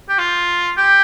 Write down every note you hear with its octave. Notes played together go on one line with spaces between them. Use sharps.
G4
F4
G4